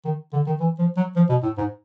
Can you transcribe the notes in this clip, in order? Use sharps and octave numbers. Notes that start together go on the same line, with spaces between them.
D#3
D3
D#3
E3
F3
F#3
F3
B2
A2
G#2